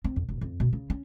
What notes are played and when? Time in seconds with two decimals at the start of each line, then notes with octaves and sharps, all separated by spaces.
0.04 C4
0.16 F2
0.29 E1
0.41 F2
0.60 B2
0.73 C#3
0.90 C#4